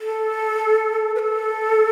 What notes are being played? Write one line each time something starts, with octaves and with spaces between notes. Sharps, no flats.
A4
B4
A4